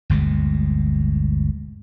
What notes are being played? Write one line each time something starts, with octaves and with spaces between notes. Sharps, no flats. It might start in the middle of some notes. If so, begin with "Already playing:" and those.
G1 D2 B2 G#3